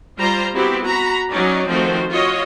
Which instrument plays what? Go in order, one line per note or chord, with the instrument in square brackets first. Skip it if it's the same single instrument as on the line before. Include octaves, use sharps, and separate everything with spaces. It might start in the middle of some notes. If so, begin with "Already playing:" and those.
[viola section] G3 F4 C5 A#5
B3 C4 E4 F#4 G4
F#4 A#5 B5
F#3 C#4 D#4 D5
D#3 F3 A3 C4 F#4 C5
F4 F#4 C#5 D#5